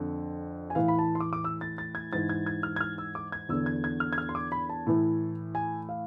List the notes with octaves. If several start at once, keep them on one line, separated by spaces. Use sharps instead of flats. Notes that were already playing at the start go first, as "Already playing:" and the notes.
Already playing: F2 D3
G#5
A2 E3 F5
B5
A5
C6
D6
D6
E6
A6
A6
G#6
G#2 E3 A6
G#6
G#6
F6
G#6
F6
E6
D6
G#6
E2 D3 E6
G#6
G#6
F6
G#6
F6
C6
D6
B5
A5
A2 E3
G#5
F5